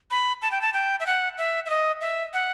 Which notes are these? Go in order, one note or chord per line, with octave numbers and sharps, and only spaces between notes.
B5
A5
G5
A5
G5
E5
F#5
E5
E5
D#5
E5
F#5